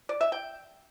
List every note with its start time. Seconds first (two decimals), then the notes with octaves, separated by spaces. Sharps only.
0.09 D5
0.21 E5
0.32 G5